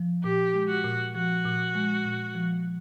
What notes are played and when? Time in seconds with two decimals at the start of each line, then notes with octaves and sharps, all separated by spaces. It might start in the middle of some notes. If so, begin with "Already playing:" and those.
Already playing: F3
0.24 A#2 G4
0.54 G#3
0.68 F#4
0.84 A#2
1.15 F3 F#4
1.45 A#2
1.75 G#3
2.06 A#2
2.35 F3